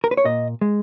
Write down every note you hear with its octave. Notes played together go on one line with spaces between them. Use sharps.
A#4
B4
C#5
A#2 D#5
G#3